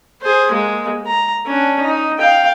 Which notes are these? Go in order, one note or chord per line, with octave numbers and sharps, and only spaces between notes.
G#4 C5
G#3 A#3
A#5
C#4 D4
D#4
F5 G5